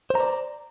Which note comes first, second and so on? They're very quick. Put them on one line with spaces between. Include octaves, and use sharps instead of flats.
C5 A#5 D5